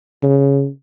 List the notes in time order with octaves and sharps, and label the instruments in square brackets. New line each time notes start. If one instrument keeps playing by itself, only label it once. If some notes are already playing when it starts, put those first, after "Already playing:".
[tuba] C#3